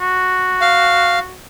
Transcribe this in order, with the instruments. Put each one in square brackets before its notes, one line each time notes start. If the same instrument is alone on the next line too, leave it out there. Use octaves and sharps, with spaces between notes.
[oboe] F#4
[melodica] F5